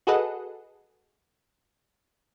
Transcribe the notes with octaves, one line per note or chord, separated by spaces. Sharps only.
F#4 G#4 A4 B4 D#5 F#5